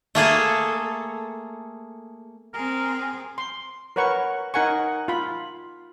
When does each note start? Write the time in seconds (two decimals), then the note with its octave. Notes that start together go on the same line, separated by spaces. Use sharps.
0.15 A3 A#3 G#4 A4
2.54 C4 G#4 A#4
3.38 C6
3.96 A#4 B4 C#5 F#5 C#6
4.54 D#4 A#4 F#5 G#5 C#6
5.08 F4 B5